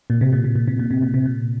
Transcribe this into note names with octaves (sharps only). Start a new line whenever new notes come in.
A#2
C3
A#2
C3
A#2
C3
A#2
C3
A#2
C3
A#2